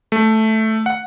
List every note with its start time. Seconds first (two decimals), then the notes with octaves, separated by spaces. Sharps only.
0.12 A3
0.86 F#5